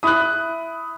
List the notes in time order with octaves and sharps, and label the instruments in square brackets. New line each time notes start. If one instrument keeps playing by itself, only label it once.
[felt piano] E4 B5 [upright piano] D#6 F#6